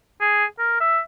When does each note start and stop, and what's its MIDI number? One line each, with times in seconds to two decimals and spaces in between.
0.21 0.45 68
0.59 0.77 70
0.81 0.99 76